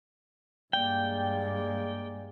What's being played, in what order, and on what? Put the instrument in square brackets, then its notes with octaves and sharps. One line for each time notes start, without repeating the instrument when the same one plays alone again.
[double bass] G2 G#3 [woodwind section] A#3 D5 [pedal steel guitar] G5